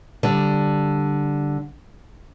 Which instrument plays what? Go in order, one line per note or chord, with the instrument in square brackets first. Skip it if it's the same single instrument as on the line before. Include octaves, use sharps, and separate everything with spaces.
[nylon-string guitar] D3 G3